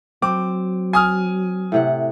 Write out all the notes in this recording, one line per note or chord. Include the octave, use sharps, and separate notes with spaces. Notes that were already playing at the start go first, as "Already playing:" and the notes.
F#3 C4 D6
G#5 D#6 F6
A2 C3 F#5